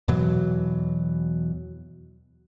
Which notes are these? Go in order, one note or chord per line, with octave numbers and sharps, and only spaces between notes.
E2 B2 E3 F#3